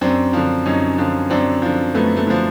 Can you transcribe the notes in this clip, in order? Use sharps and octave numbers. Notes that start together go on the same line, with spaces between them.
F#2 C4 D4
D3 F3
F#2 C#4 D#4
D3 F3
F#2 C4 D4
D3 F3
F#2 A3 B3
A3
D3 F3